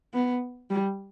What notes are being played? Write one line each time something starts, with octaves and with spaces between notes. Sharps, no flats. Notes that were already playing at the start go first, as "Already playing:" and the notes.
B3
G3